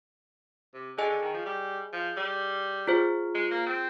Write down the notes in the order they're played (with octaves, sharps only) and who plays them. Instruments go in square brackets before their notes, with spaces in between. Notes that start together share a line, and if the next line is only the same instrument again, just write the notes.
[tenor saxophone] C3
[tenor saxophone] D3 [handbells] G#4 D#5 G#5
[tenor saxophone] D3
D#3
F3
G3
F3
G3
[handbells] F4 G#4 C5
[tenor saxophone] G#3
A#3
C4